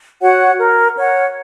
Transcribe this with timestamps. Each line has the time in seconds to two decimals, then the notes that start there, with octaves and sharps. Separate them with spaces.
0.21 F#4 C#5 F#5
0.58 A#4
0.96 C#5 F#5